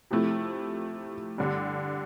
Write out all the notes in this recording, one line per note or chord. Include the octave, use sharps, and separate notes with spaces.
C3 F3 A3 E4
G2 D3 G3